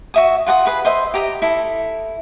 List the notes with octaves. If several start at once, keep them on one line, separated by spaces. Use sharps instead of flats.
F#4 E5 D#6
F4 F#5 A5 D#6
G#4 B4
C5 D#5 E5 C6
G4 A#5 D#6
E4 A4